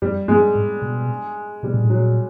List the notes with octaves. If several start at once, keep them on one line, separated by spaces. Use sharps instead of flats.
F#2 G3
G2 G#3
G#2
B2
B2 G3
A#2
A2
A#2 F#3